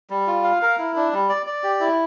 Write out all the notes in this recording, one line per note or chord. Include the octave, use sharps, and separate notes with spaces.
G3
F4
F5
A#4
E4
D4
G3
D5
D5
G4
E4